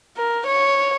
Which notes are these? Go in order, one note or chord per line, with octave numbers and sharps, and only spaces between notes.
A#4
C#5